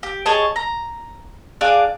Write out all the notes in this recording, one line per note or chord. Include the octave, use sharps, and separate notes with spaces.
G4
G#4 C#5 D#5 A5
A#5
D4 G#4 F5 D6